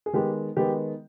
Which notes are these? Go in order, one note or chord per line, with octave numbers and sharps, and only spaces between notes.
G#4
D#3 G#3 B3 G4
D#3 G#3 B3 G4